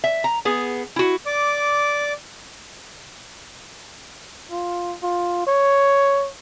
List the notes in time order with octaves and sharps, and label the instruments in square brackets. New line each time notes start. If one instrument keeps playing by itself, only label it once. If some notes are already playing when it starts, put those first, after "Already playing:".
[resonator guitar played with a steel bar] E5
A#5
B3 G#4
E4 F#4
[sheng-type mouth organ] D5 D6
[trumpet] F4
F4
C#5